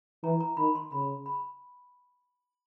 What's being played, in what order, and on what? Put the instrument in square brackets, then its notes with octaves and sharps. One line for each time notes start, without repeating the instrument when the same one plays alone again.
[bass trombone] E3 [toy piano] A#5
[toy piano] A#5
[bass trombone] D#3 [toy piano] B5
[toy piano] C6
[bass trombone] C#3 [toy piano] B5
[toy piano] B5